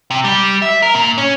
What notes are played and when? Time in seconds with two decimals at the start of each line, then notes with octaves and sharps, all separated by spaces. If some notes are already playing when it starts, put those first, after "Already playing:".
0.10 C3
0.24 G3
0.62 E5
0.82 A#4
0.94 A#2
1.18 C#4